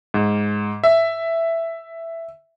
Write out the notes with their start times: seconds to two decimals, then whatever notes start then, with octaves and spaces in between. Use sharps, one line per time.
0.14 G#2
0.84 E5